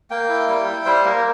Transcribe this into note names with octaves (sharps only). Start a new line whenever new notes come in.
A#3 G5
E4
G3
E4
G3 C5
A#3 A#4